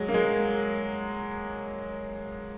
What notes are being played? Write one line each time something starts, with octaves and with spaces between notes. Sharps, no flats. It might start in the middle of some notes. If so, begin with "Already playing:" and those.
Already playing: F#3 G#3
A#3
G#3